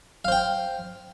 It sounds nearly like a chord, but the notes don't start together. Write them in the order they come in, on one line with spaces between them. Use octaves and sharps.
F5 C5 G5